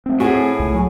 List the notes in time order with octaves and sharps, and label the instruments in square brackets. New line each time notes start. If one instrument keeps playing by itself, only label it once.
[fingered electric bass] A3 C4
[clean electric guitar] A2 [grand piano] F#4 G#4 [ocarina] G#5
[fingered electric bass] C#2
F#3